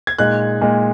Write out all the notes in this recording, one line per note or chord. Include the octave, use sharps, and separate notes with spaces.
G#6
A#2 G#3 D#4 F#6
A#2 G#3 D#4